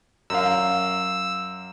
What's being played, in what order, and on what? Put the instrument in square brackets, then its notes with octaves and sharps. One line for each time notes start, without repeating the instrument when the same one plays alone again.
[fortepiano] F#2 F5 [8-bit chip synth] E6